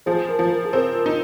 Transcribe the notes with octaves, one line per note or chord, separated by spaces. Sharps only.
F3 G#4 C5
A#4
F3
A#4
G#4
C4 A#4
A#4
D#4